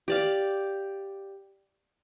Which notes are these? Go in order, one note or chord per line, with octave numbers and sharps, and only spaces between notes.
G4 D5 F5